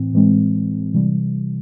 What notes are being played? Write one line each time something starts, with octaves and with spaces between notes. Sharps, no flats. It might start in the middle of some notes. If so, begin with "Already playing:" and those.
Already playing: A2 E3 C4
A2 E3 G#3 C4
C3 E3 G3